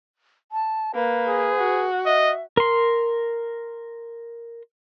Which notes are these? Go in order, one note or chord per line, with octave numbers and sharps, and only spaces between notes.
A5
A#3 B4
G#4
F#4
D#5 E5
A#4 C6